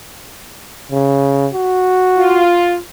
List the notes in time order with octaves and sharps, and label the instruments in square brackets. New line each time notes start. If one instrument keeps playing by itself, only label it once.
[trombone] C#3
F#4
[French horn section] F4